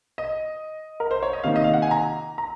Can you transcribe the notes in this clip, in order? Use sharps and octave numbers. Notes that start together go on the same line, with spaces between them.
D#5
A#4
C5
C#5
D#5
C3 D#3 A#3 D#4 F5
D#5
F5
F#5
G#5
A#5
A#5